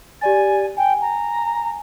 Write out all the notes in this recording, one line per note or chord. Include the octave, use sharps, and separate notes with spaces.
G4 D5 G#5 A6
G5 G#5
A#5